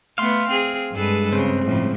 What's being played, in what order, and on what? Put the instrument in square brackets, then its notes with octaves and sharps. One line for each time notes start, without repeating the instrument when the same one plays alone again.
[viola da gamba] A3 B3 [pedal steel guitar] F5 C6
[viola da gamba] C4 G#4
[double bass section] G2 G#3 [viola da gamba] G#4 A4 B4
[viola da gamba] C#3 [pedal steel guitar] C4
[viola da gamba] A2 C#3 F3